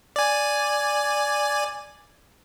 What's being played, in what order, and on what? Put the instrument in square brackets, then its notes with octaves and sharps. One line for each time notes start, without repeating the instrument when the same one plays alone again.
[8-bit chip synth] D5 G#5